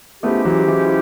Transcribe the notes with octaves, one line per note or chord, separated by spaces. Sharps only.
F3 G#3 A3 B3 C#4 E4 G4
E3 F#3
E3 F#3